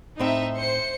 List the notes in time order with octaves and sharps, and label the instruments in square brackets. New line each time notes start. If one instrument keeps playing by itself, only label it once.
[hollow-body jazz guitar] A2 C4 [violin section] D#4 E5
[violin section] C5 C#7